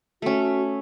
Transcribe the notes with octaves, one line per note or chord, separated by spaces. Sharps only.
A3 C#4 F#4